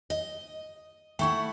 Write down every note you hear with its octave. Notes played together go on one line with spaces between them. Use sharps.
D#5
A3 E4 F#5 G5 C#6